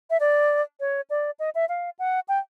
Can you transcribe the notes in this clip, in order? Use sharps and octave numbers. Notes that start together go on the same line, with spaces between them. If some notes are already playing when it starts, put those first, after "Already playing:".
E5
D5
C#5
D5
D#5
E5
F5
F#5
G5